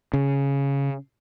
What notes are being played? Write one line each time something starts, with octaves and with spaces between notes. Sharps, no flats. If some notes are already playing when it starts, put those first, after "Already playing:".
C#3